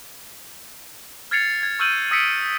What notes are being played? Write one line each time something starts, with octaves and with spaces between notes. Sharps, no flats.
F6 G#6 A6 C7 C#7 F7
G#6
C#6 E6 F6 G6 D#7 F#7
D#6 E6 A#6 B6 C#7 D7